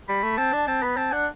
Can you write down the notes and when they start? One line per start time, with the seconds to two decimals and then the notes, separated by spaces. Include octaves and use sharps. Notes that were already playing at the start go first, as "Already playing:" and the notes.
0.08 G3 B5
0.23 A3
0.37 C4 A5
0.53 D4
0.67 C4 A5
0.82 B3 B5
0.97 C4 A5
1.12 D4 F#5